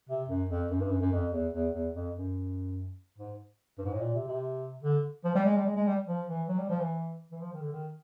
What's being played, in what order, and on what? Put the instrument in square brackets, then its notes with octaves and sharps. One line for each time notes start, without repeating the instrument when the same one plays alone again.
[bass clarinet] C3
F#2
F2
F#2
G2
F#2
F#2
F2
E2
E2
E2
F2
F#2
G#2
G2
G#2
A2
A#2
C3
C3
D3
F3
G3
G#3
G3
G#3
G#3
G3
F3
E3
F#3
G3
F3
E3
E3
F3
D#3
D3
D#3